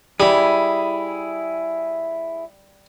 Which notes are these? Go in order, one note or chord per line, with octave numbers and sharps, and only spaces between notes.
G3 E4 G#4